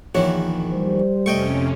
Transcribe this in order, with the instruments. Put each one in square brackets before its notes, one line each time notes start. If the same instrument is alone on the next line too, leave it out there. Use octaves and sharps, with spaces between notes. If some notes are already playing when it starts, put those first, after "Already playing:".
[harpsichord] A#1 E3 F#4 [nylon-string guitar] E2 D#3 C#5
[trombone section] G3 C5
[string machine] F2 C3 C#4 [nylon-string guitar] A3 [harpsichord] D#5 G5 C#6